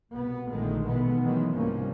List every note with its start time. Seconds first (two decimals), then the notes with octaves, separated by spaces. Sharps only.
0.13 C2 B2 B3
0.49 A#1 A#2 D3 D#3 G#3 A3
0.85 B2 D#3 E3 G#3 A3 B3
1.24 D#3 E3 F#3 G#3
1.54 C2 G#2 F3 G3 A#3 C#4